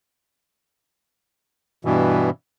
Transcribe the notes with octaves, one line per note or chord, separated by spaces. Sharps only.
G2 B2 E3